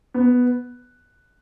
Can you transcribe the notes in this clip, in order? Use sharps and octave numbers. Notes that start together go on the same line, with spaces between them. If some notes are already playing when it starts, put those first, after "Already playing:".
B3